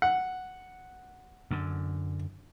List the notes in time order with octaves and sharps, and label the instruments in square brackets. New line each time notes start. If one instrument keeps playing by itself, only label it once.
[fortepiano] F#5
[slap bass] F#2 D3